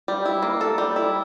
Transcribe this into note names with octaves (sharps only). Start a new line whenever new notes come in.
G3
E4
A#3
A4
G3
E4